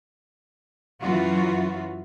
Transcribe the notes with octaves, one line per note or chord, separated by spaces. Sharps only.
F#2 E3 F#3 F4 F#4